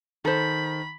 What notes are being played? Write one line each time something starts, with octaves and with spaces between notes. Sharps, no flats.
D#3 A4 C5 B5